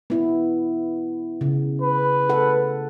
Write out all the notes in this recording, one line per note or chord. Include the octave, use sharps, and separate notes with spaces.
B3 E4
C#3
B4
A4 F#5